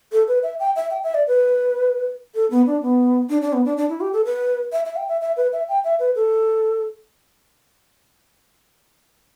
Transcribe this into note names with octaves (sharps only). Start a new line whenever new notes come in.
A4
B4
E5
G5
E5
G5
E5
D5
B4
A4
B3
D4
B3
D4
D4
B3
D4
D4
E4
G4
A4
B4
E5
E5
G5
E5
E5
B4
E5
G5
E5
B4
A4